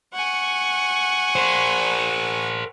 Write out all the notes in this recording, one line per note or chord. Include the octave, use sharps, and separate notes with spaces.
F#5 G#5 C#6
A#4 C5